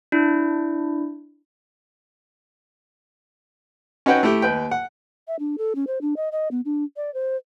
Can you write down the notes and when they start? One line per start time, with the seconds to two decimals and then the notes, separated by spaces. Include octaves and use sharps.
0.12 D4 E4
4.06 C#4 D#4 F#4 B4 F#5 G5
4.23 A3 E4 G4
4.42 D#2 B4 G5
4.71 F#5
5.28 E5
5.39 D4
5.58 A4
5.75 C#4
5.87 C5
6.01 D4
6.17 D#5
6.32 D#5
6.51 B3
6.65 D4
6.97 D5
7.14 C5